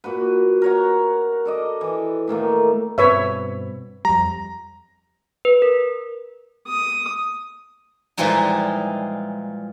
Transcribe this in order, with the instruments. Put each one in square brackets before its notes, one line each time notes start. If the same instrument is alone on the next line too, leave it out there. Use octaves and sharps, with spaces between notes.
[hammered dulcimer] A#2 F#4 B4
A#4 C#5 F#5
A4 D5 D#5
E3
A2 D#3 A3 A#3
[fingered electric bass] G2 B2 C4 [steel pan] B4 C#5 E5
[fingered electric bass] F2 G3 [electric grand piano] A#5
[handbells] B4
A#4
[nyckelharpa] D#6
[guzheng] A#2 E3 F3 G3 G#3 D#4